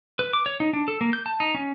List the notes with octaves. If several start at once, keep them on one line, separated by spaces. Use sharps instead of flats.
B4
D6
C#5
D#4
D4
A4
A#3
G6
A5
D#4
C#4